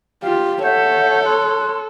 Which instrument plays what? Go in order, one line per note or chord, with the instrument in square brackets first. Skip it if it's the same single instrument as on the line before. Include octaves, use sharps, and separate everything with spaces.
[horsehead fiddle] F4 [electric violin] G4
[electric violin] A4 [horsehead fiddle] C#5 [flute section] E5 F#5 G6
[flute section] C6 F#6